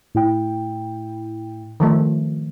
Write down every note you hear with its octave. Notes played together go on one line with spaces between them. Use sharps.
A2 E4 G5
D#3 F3 A3